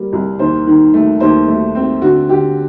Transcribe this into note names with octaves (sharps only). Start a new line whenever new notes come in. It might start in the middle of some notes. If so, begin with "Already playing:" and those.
Already playing: G3 A#3
C2
D#2 C5
D#3
A3
D#2 C5
A3
C4
D3 F#4
D3 G4